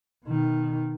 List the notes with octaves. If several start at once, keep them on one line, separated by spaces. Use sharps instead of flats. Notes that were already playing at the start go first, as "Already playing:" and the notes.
B2 D#3